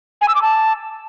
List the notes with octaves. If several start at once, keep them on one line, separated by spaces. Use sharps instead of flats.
G#5
E6
D6
A5